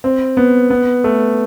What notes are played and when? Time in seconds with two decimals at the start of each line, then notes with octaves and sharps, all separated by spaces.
0.04 C4
0.37 B3
0.70 B3
1.04 A3